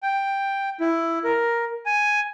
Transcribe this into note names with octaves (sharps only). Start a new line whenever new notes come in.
G5
E4
A#4
G#5